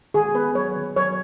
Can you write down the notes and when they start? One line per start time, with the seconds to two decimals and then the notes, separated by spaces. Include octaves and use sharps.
0.14 D#3 G#4
0.35 B3 B4
0.55 F#3 C#5
0.76 D#3
0.96 F#3 C#5